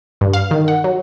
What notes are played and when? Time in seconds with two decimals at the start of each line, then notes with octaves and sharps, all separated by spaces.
0.21 G2
0.33 F5
0.51 D#3
0.68 F#5
0.84 F#3